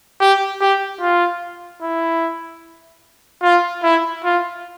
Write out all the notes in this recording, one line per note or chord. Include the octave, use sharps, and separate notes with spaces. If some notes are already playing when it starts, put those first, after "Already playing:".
G4
G4
F4
E4
F4
E4
F4